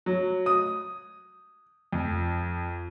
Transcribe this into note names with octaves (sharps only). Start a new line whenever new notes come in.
F#3
D#6
F2